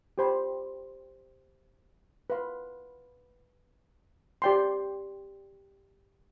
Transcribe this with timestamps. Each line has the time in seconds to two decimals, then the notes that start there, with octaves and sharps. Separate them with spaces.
0.18 G4 C5 G5 B5
2.30 B4 F5 C6
4.42 G4 D5 G5 C6